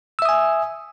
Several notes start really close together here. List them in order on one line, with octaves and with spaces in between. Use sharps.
E6 E5 D#6 G#5